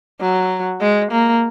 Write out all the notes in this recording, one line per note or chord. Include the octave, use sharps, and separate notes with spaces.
F#3
G#3
A#3